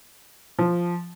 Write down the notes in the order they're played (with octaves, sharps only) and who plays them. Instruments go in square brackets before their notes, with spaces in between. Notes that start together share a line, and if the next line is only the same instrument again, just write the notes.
[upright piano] F3